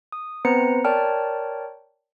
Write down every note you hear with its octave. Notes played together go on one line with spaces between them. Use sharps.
D#6
B3 C4 B4 C5 A#5 C#7
A#4 C#5 D5 G5 A5 F6